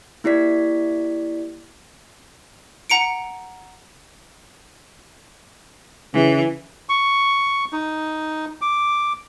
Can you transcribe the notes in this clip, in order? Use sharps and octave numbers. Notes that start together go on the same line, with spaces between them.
A#3 E4 G4 D5 B6
F#5 A#5 C#7 D7
C#3 E3
C#6
D#4
D6